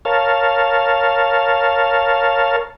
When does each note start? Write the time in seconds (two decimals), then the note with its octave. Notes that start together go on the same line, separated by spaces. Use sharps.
0.05 A#4 C#5 F5 A5